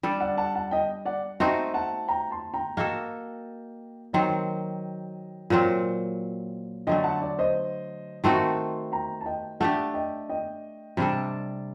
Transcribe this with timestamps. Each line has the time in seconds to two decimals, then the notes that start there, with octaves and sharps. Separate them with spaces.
0.03 G3 D4 A4
0.20 D5 F#5
0.37 F#5 A5
0.55 F#5 A5
0.71 D#5 G5
1.05 D5 F#5
1.40 A3 C4 D#4 F#4 D#5 G5
1.74 F#5 A5
2.08 G5 A#5
2.31 A5 C6
2.54 G5 A#5
2.77 A#3 F#4 A4 D#5 G5
4.13 D#3 F#3 C4 D#5 G5
5.50 A#2 F#3 C4
6.87 D3 F#3 A3 D#5 G5
7.04 F#5 A5
7.22 D5
7.39 C5 D#5
8.24 D#3 A3 C4 F#4 A5 C6
8.92 G5 A#5
9.21 A5
9.26 D#5 G5
9.60 A3 D4 G4 F#5 A5
9.94 D#5 G5
10.30 D#5 G5
10.97 C3 G3 D4 A4